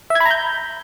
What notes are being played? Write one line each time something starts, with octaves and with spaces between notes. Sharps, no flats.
E5
G#6
B5
A#5
G6